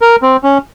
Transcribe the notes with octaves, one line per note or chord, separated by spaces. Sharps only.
A#4
C4
C#4